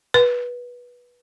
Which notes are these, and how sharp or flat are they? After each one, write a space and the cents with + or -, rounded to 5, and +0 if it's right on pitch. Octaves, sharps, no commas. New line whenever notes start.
B4 -15